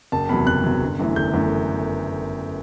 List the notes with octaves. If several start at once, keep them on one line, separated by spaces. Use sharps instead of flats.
F#1 A5
E2 C3 F#3 B5
F#1 F#6
E2 C3 F#3
G1
F#2 E3 A3
G1 G6
F#2 E3 A3